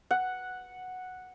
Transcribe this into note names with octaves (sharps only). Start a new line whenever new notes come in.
F#5